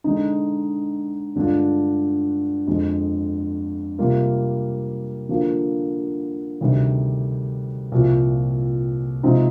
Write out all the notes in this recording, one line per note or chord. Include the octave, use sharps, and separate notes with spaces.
D3 G#3 D#4
G2 D3 G#3 D4 F4
F2 D3 G#3
C3 G3 A#3 F4
D3 F3 A#3
D2 C3 D#3 G3
C2 A#2 F3 C4
C3 F3 G#3 C4 D#4